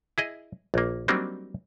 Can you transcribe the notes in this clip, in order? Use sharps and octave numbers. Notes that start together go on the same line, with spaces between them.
E4 G#4 D#5
A#1 A#3
F#3 G3 A#3 C4 D4 D#4